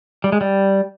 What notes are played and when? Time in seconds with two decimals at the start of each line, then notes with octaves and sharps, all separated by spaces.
0.24 G3
0.32 G#3
0.41 G3